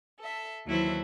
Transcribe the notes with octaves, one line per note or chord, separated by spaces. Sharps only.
A4 E5
D#2 E3 F#3 E4 A4 C5